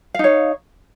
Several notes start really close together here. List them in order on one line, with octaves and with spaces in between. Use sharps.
F5 D#4 C#5